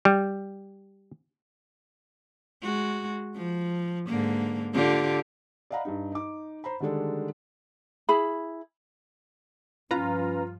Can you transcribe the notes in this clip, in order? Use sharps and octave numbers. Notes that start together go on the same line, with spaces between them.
G3
G#3 F#4
F3
G#2 D3 A#3
D3 F4 G4
D5 D#5 F5 F#5 A#5 B5
G2 G3 D#4
D#4 D6
C5 A#5 B5
D3 D#3 G3 G#3 D4 A4
E4 G#4 B5
G2 F3 C#4 F4 B4 A#5